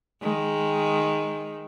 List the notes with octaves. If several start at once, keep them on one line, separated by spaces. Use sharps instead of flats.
D#3 G#3